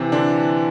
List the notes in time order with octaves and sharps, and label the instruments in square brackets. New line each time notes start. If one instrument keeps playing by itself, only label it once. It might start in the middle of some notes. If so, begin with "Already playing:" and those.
Already playing: [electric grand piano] C3 C4 [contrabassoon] E3
[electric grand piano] D3 D4